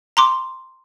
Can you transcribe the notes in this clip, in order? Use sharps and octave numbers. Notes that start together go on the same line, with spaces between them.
A#5 C6 D6